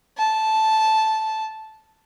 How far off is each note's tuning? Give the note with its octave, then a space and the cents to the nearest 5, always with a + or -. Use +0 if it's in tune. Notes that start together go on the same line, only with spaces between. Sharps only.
A5 -5